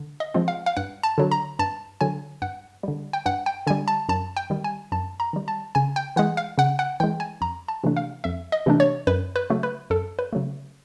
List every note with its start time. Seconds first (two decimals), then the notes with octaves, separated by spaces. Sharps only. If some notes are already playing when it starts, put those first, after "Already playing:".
Already playing: D3
0.20 D#5
0.34 F3 G#3 C4 F4
0.48 F5
0.66 F5
0.77 G2 F#5
1.03 A5
1.18 D3 F#3
1.31 A#5
1.59 G2 A5
2.01 D3 F#3 G#5
2.42 G2 F#5
2.83 D3 G3
3.13 G5
3.26 G2 F#5
3.46 G5
3.67 D3 G3 G#5
3.88 A5
4.09 F#2 A5
4.37 G5
4.50 D#3 G3
4.64 G#5
4.92 F#2 A5
5.20 A#5
5.33 D#3 G3
5.48 A5
5.75 C#3 G#5
5.96 G5
6.16 E3 G#3 F#5
6.37 F5
6.58 C#3 F#5
6.79 F#5
7.00 E3 G#3 G5
7.20 G#5
7.41 F2 A#5
7.68 A5
7.83 C3 E3 A3 D4
7.97 F5
8.24 F2 E5
8.52 D#5
8.66 C3 E3 A3 D4
8.80 C#5
9.07 F#2 B4
9.36 B4
9.50 C#3 F#3 A3
9.63 B4
9.90 F#2 A4
10.19 B4
10.33 C#3 F#3 A3